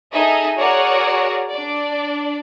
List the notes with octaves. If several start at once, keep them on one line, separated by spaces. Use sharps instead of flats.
D#4 G#4 A4 D#5 E5
F#4 G#4 A#4 C#5 D5 F#5
D4 D5